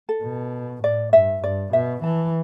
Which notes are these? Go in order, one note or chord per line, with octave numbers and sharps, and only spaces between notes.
A4
B2
A2 D5
G2 E5
G2 D5
B2 E5
E3 A5